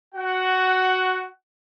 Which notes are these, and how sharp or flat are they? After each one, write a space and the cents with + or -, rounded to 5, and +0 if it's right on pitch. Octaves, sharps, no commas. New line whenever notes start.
F#4 +0 F#5 +15